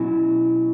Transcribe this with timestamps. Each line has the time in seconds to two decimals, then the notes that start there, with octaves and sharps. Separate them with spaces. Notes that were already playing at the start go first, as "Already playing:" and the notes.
Already playing: B2 F#3 C#4 E4